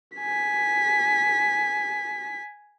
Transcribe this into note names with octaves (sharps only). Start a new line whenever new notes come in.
G#5 B6